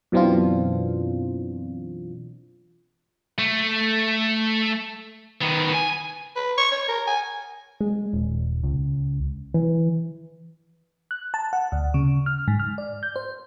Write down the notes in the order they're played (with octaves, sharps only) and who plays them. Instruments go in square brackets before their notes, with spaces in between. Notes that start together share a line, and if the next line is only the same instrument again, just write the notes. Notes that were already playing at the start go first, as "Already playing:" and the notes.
[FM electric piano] F#2 B2 E3 C4 D4 F4
[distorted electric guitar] A3
D#3 B3
G#5
[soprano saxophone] B4
C#6
C#5
A#4
G#5
[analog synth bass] G#3
D#1
C#2
E3
[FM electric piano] F#6
A5
F#5
D2
C#3
F6
G#2
F6
D5
G6
C5